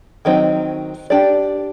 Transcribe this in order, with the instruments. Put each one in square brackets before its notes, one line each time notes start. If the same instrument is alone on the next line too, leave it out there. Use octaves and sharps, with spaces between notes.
[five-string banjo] D#3 F#3 C4 D#4
D4 G4 D5